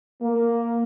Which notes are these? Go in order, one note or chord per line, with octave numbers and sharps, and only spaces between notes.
A#3